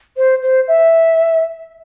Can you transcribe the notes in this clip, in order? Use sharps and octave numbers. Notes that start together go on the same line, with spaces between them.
C5
C5
E5